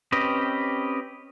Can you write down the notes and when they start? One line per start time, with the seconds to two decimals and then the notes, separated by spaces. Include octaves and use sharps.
0.12 C4 C#4 G4 B4 D#5